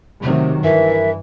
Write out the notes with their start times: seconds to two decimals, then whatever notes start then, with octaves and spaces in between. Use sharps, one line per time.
0.23 C3 D#3 F#3 A3
0.64 G2 E3 A#4 E5